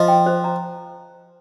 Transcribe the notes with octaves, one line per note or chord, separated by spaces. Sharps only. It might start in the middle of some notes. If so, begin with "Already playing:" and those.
Already playing: F3 D#5
G5
C5
A#5